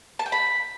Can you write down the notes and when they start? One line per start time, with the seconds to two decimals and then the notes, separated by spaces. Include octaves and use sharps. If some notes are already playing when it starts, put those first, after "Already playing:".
0.19 A5
0.26 G5
0.32 B5